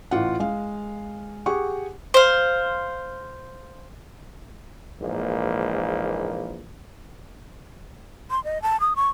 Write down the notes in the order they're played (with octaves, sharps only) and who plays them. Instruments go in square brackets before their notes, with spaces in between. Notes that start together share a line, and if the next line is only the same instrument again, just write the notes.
[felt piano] A1 F4 F#5
G#3 F5
G4 G#4 F#5 C#6
[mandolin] C5 F5
[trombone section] A#1 G#2 E3 A#3
[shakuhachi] C6
D#5
A5
D#6
C#6